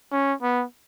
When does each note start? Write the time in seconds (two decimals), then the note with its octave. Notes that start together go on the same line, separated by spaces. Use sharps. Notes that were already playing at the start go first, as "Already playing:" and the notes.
0.12 C#4
0.42 B3